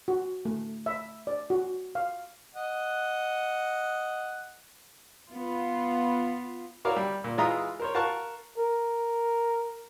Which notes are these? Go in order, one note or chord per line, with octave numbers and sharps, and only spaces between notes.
F#4
A3
E5
D5
F#4
F5
D#5 F#5
B3 F4
E4 F#4 A#4 C#5 D5 F5
G3
A#2
E3 G#3 F4 E5 A#5 D#6
A#4 C5 C#5
A#4 F5 F#5 A5 C#6
A#4